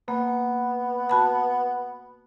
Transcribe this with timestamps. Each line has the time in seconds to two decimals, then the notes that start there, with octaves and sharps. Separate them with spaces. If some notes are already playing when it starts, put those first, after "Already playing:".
0.08 A#3 B3
1.09 F#4 A5 B5